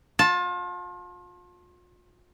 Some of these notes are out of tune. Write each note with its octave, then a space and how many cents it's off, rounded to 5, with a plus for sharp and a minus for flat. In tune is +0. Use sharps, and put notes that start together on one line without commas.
F4 +35 A5 +0